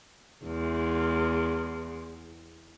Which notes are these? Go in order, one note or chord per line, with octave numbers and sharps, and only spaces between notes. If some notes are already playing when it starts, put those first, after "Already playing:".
E2 G#3